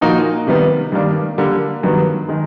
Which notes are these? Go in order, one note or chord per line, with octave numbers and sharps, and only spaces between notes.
A#2 F3 A#3 D#4 F#4
C3 D#3 G3 B3
G2 D#3 G3 A#3 D4
D3 G3 A#3
G2 D#3 F#3 B3
D#3 G#3